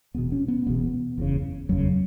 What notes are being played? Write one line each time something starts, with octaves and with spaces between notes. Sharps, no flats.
E1 E2 B2 B3
C#4
B3
E1 E2 B2 B3
F#1 E2 C#3
F#1 E2 C#3 F#3